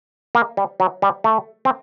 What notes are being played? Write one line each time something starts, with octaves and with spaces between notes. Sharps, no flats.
A#3
G3
F#3
G3
A3
C4